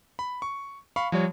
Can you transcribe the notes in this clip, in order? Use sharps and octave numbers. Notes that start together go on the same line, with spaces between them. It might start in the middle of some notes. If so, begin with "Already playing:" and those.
B5
C#6
F5 B5 C#6
F3 G3 C#5